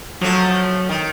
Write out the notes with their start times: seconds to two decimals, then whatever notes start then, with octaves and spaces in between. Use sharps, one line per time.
0.21 F3 F#3 A3
0.89 D#3